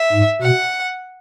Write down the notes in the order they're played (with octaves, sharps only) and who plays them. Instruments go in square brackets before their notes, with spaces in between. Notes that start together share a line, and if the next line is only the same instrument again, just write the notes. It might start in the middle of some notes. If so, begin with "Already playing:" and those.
Already playing: [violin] E5
[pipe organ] G#2
[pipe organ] B2 [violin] F#5